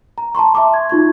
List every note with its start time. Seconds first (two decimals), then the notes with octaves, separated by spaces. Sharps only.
0.18 A#5
0.35 A5 A#5 C6 C#6
0.55 E5 A5 C6 D6
0.74 G#6
0.90 D#4 F4 C#6 G#6